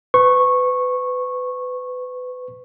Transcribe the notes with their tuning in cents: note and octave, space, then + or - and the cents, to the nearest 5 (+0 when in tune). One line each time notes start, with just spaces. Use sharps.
B4 +30 C#6 -15